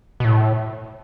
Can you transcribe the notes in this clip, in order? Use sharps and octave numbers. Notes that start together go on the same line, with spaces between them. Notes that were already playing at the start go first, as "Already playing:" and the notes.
B2
A2